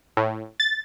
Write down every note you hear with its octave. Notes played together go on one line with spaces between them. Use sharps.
A2
A6